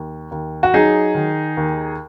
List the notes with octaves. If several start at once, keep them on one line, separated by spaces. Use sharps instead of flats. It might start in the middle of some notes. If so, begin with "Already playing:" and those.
Already playing: D#2
D#2
F#4
F#3 D#4 G#4
D#3
D#2